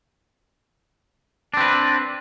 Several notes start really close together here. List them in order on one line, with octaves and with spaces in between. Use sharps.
D4 C4 B4